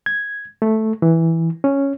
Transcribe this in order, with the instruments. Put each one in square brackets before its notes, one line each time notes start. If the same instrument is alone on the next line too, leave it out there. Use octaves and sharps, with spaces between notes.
[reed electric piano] G#6
A3
E3
C#4